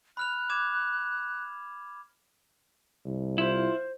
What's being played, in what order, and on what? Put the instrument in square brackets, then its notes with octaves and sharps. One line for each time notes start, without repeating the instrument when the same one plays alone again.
[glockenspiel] B5 F6 F7 [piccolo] F#6
[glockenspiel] D6 G#6 E7
[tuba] C2
[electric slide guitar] E4 [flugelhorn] F4 [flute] C5